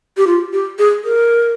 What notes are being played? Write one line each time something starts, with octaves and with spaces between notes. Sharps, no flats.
G4
F4
G4
G#4
A#4